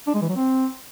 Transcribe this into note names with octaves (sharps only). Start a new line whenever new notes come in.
D4
G#3
E3
F#3
C4